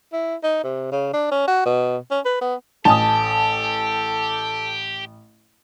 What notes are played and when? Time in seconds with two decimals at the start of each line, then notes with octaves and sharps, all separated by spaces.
0.13 E4
0.43 D#4
0.63 C3
0.92 C#3
1.13 D4
1.31 C#4
1.47 F#4
1.65 B2
2.11 C#4
2.25 B4
2.41 B3
2.85 A1 G4 A4 G#5 A5 D#6